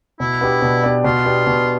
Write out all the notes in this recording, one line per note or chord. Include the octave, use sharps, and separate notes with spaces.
B2 E4
B3 D4 G4 D5
B2
B3 D4 G4 D5
B2 F4
B3 D4 G4
B2